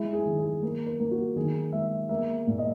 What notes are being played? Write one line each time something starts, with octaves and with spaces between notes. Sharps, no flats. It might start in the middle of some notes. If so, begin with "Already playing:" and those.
Already playing: G#3 E4
G#4
D#3
G#4
A#3
A#4
A#3
F#4
D#3 G#4
G#3 E5
A#3 E5
A#2
D#5